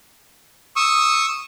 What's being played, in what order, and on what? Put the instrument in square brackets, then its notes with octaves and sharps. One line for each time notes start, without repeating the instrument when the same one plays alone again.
[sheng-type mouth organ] C#6 D#6 E6